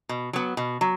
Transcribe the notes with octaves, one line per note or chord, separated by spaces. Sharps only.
B2
F#3 B3
B2
F#3